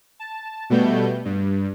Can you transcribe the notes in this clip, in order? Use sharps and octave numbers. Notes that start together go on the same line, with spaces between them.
A5
B2 G3 A3 B3 G6
G2